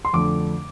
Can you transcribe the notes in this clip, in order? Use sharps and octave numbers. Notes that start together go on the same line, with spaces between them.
C6
F2 D3 A3 D6